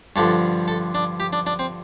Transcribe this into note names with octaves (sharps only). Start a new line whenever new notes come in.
G2 D3 F3 A4
A4
D4
G4
D4
D4
C4